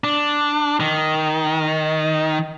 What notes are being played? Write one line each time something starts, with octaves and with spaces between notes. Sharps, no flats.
D4
D#3